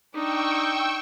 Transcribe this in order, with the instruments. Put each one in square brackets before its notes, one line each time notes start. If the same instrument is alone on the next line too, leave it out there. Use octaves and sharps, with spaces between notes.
[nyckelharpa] D4 D#4 [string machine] G5 C#6 E6